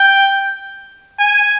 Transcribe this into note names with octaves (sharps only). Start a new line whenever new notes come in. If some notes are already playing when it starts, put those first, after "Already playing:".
Already playing: G5
G#5